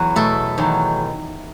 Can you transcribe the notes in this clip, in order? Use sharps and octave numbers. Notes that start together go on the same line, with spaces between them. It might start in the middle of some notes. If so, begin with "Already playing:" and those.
Already playing: E2 F#3 B4
B2 A3 A4
E2 D#3 F#3